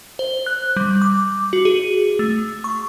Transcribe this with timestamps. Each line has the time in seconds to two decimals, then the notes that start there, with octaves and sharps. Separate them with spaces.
0.19 C5
0.46 F#6
0.76 G3
1.02 D6
1.53 F#4
1.65 G#4
2.19 A3
2.64 C#6